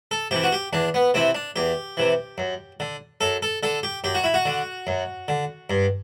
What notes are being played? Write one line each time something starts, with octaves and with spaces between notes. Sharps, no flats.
A4
C3 E3 G4
F#4
G4
E2 D4
B3
C3 E3 C4
D4
E2 G4
C3 E3
F#2
D3
F#2 A4
A4
D3 A4
G4
F#2 G4
F#4
E4
F#4
D3
F#2
D3
G2